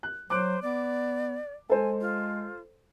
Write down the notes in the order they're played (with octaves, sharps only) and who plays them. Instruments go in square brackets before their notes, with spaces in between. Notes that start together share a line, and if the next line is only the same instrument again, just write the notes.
[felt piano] F#6
[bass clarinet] F#3 [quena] C5 [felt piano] D6 F#6 D7
[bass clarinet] B3 [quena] D5
[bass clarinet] G#3 [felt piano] A4 C5 [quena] G#5
[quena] F4